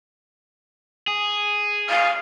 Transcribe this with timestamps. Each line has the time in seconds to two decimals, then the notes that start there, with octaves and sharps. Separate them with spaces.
1.08 G#4
1.89 F5